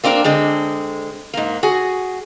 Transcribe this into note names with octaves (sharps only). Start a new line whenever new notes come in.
A#3 C4 D4 F4 A#4
D3 G#3 C4
G#2 A#3
F#4 G#4